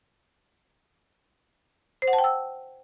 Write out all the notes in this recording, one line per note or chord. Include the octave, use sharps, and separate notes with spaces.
C5
F#5
A5
G5
E6